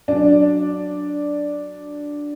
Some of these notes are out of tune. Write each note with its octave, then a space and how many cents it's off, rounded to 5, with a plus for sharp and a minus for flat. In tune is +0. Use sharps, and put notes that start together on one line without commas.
F#3 +0 D4 +0